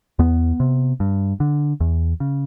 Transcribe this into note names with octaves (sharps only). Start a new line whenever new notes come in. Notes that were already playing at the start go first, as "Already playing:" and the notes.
E2 B3
C3
G2
D3
E2
C#3